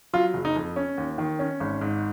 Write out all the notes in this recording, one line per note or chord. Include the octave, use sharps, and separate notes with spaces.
F#3 F4
F#1
D#4
F2
C#4
D#2
D#3
C#4
G#1
G#2